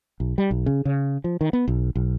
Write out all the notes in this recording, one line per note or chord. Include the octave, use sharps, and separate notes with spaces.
B1
G3
B1
C#3
C#3
F3
D#3
B3
B1
B1